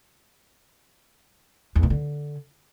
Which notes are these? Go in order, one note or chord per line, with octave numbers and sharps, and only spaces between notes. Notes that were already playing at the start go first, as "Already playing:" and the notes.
E2
A#2
D3